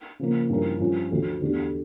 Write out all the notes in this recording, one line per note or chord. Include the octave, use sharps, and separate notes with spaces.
C#3 F3 A#3
G2 F3 C#4 E4 A#4
G2 F3 C#4 F4
D2 D3 F3
E2 D3 A3 D4 G4